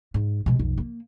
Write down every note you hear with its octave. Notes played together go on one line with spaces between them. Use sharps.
G#2
B2 G#3
B1 F2
A#3